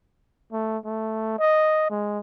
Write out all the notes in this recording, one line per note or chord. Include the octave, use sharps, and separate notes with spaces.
A3
A3
D#5
G#3